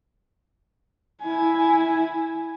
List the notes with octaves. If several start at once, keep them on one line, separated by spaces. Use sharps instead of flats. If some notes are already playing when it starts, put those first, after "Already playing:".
E4 G#5